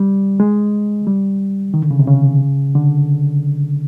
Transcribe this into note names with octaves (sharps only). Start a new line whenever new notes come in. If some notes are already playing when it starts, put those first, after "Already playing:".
Already playing: G3
G#3
G3
D#3
D3
C#3
C3
C#3
D3